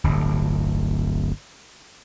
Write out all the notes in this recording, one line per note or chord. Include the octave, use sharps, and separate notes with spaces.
D1 G1